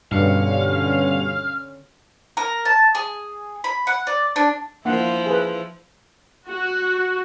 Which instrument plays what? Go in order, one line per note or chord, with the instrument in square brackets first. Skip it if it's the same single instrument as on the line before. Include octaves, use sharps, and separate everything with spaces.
[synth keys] G2 B2 C#7 [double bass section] D3 C#4 [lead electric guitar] F5
[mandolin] A#4
A5
G#4
B5
F#5
D5
D4
[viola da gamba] F3 E4 [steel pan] A#3 D4 F#5
[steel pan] G#4 B4
[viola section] F#4